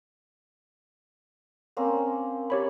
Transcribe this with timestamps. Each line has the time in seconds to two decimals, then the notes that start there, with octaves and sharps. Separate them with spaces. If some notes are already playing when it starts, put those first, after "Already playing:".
1.77 A#3 C4 C#4
2.50 G4 C#5 B5